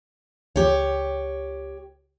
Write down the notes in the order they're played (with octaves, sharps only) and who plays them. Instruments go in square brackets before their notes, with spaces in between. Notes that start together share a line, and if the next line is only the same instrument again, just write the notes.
[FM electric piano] C#2 [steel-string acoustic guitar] G4 C#5